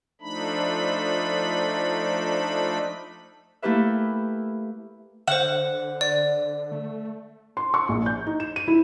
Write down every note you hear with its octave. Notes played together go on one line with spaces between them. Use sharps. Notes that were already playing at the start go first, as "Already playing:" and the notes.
F3 A3 D4 D#4 B5
A3 A#3 E4 G4 B4 E5
D3 C5 F#5 E7
D5
A3
C6
C#6
A#1
G6
D#4
E7
D#7
E4